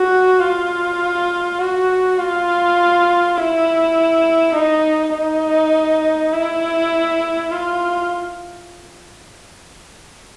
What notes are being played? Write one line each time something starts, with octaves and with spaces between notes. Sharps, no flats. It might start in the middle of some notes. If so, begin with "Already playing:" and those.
Already playing: F#4
F4
F#4
F4
E4
D#4
D#4
E4
F4